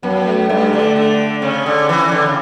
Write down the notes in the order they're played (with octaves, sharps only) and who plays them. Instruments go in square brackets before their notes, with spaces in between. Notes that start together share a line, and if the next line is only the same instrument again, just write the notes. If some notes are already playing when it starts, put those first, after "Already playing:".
[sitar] F#2 [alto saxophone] B3
[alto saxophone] A3
[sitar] G2 [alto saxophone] A3
[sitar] D3
D3
[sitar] C#3 [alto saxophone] C#4
[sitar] D3
E3
D3
C#3